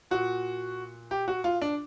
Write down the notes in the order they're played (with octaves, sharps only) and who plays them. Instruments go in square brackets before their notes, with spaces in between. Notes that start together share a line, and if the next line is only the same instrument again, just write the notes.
[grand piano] A#2 F#4
G4
F#4
F4
D4